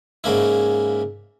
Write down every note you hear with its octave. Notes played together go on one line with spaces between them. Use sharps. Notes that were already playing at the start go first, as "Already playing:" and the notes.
G#2 C#3 A#3 E4